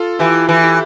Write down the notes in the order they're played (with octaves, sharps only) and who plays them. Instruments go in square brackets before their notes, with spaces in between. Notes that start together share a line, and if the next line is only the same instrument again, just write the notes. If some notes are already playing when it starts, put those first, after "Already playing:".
Already playing: [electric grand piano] F4 A4
[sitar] E3 [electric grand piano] E4 G4
[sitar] E3 [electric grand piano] E4
[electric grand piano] E4 G4